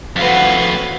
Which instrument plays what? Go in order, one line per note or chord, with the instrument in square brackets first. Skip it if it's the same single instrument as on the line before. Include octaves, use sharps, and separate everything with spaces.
[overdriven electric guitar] F2 A2 [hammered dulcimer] F#4 [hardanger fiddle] B4 F5